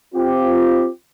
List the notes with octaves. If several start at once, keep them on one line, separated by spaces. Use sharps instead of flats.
C4 F4 G4